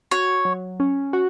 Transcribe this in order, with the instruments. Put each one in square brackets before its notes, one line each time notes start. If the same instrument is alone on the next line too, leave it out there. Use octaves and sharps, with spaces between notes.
[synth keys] F#4 [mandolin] C#5
[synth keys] F#3
C#4
F#4